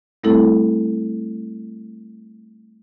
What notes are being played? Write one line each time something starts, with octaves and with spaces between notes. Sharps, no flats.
G3 A3 C4 E4 A4